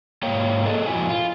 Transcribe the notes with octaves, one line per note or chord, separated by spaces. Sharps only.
G#2 A#3 C#5 F5 G5 A#5
G#4 A4 D#5
F2 A#2 C#3 E4 F#4 G#5
F4